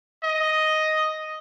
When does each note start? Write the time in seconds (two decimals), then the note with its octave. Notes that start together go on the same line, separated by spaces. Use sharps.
0.24 D#5